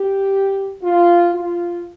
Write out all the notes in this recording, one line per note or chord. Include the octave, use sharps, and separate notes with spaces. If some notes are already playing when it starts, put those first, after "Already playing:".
Already playing: G4
F4
F4